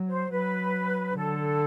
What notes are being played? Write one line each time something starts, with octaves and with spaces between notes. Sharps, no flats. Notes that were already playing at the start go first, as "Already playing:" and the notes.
Already playing: F#3
C5
F#3 B4
D3 A4